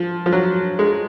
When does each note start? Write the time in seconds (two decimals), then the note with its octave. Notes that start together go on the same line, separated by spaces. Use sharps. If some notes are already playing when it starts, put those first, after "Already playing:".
Already playing: F3
0.26 F3
0.32 F#3
0.79 G#3